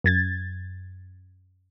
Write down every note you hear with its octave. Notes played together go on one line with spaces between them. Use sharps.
F#2 G#6 A6